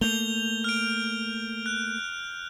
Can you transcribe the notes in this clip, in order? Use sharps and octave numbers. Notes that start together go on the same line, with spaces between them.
A3 A#3 G6 F7 G7
F6 D7
F#6